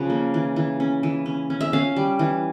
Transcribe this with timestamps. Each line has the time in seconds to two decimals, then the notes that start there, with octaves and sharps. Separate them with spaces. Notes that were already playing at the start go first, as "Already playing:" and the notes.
Already playing: C#3 F3 F#5
0.10 A#3
0.34 E3
0.56 E3
0.80 C#4
1.03 E3
1.26 C#4
1.50 C#4
1.61 E5
1.73 C#4 F5
1.96 G3
2.19 E3